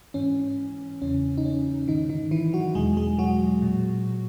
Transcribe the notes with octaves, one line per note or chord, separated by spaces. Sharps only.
G#2 E3 C#4
E2 C#3 E3 C#4
D#4
C#4
G#2 D#3 E3 D#4
D#3 D#4
E3 E4
F#3 F#4
E2 B2 G#3 G#4
G#3 G#4
F#3 F#4
A#2